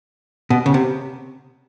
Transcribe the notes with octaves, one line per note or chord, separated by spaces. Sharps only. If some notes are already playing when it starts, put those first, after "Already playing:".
B2
C#3
C3